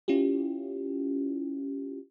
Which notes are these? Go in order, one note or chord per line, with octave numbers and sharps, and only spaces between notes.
C#4 E4 F4 G4